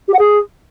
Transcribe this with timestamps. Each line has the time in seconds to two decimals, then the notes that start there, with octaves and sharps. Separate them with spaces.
0.08 G4
0.13 F#5
0.19 G#4